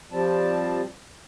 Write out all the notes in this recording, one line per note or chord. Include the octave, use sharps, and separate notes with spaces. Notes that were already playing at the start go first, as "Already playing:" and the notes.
F3 G3 C4 A5